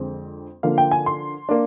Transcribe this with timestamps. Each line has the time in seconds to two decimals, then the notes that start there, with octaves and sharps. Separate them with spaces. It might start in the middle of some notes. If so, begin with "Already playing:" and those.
Already playing: F2 D3 G#3 C4
0.63 D3 F3 A#3 F5
0.78 G5
0.91 G#5
1.06 C6
1.49 A#3 D4